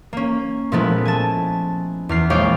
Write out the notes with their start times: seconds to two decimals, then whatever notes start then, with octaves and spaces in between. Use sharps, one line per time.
0.13 A#3 C#4
0.72 A#2 F3 G#3 A3 B3 E4
1.05 G#5 A5
2.09 E2 F6 C7
2.30 A#1 G#3 C#5 F5 G5 D6